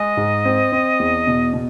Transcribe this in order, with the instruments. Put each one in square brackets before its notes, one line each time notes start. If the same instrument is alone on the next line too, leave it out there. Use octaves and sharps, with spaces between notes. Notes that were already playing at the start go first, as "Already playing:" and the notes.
Already playing: [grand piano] G#3 [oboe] D#5
[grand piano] G#2
C4
C4
E2
B2
B2